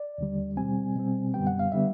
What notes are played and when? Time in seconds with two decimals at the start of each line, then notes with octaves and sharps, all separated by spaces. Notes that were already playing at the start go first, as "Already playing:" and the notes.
Already playing: D5
0.18 D#2 D3 G3
0.57 B2 G3 C4 G#5
0.96 B2 G3 C4
1.34 F#2 D3 G3 B3 G5
1.47 F#5
1.59 F5
1.72 D3 G3 B3 E5